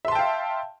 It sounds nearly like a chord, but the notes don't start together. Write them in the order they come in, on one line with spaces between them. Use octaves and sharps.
E5 C6 A5 G5 F5